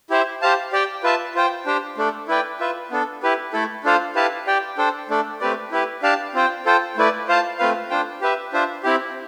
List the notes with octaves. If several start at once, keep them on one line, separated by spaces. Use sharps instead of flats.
E4 G4 C5 E5
G4 C5 F5 A5
G4 D5 G5
F4 B4 E5 A5
F4 C5 G5
D4 G4 C5 G5
A3 D4 A4 D5
E4 B4 D5 G5
F4 B4 E5
B3 D4 A4
E4 G4 B4
A3 E4 A4
D4 F4 A4 C5 F5
E4 G4 B4 F5 A5
G4 D5 G5
D4 A4 C5 G5
A3 D4 A4 D5
A3 C4 G4 B4 D5
E4 G4 B4
D4 G4 D5 F5 A5
C4 F4 C5 G5
F4 A4 C5 G5
A3 E4 B4 D5
F4 C5 F5 A5
A3 C4 F4 B4 F5
D4 F4 C5 G5
G4 B4 E5
D4 F4 C5 E5
C4 E4 G4